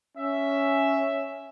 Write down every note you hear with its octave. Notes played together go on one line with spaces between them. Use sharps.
C#4 E5